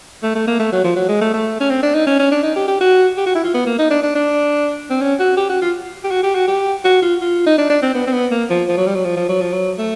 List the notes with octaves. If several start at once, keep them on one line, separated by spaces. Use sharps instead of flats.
A3
A3
A#3
A3
F#3
F3
F#3
G#3
A3
A3
C#4
C4
D4
D#4
C#4
C#4
D4
D#4
G4
G4
F#4
G4
F#4
E4
F4
B3
A#3
D#4
D4
D4
D4
C4
C#4
F#4
G4
F#4
F4
G4
F#4
G4
F#4
G4
F#4
F4
F4
D#4
D4
D4
C4
B3
C4
B3
A#3
F3
F3
F#3
G3
F#3
F3
F3
F#3
F3
F#3
A3